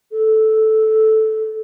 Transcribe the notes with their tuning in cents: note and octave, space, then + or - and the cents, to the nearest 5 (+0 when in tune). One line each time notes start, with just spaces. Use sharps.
A4 -5